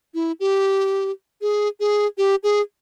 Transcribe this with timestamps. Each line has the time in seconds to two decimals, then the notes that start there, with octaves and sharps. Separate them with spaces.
0.14 E4
0.40 G4
1.41 G#4
1.80 G#4
2.18 G4
2.43 G#4